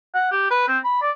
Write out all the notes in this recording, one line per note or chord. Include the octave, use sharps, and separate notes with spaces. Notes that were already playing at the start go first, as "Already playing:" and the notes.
F#5
G4
B4
C4
B5
D5